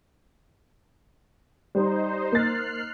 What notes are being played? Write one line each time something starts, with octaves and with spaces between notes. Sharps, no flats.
G3 D#4 C5
A#3 F6 F#6 A6 C7